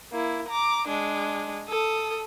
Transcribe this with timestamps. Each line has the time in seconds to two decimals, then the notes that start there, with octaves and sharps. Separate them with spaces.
0.11 A#3 E4
0.48 A#5 D6
0.87 G#3 D4
1.68 A4 D#6